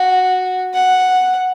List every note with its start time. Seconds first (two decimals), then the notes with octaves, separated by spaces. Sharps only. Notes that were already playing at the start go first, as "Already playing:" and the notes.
Already playing: F#4
0.74 F#5